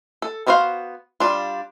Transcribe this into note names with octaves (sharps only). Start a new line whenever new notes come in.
A4
B3 D4 F#4 C5 F5
G3 D4 F4